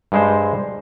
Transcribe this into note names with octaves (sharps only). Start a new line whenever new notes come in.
G2 G#3 C5